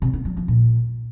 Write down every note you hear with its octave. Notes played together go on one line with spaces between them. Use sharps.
C3
B3
F#3
F3
A#2